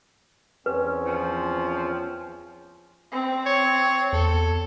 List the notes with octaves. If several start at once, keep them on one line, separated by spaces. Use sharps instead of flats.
E2 C4 C#4 B4
F3
C4
C#5
E2 A4